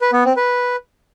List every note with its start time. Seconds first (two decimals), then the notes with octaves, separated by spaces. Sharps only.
0.01 B4
0.13 B3
0.25 C4
0.37 B4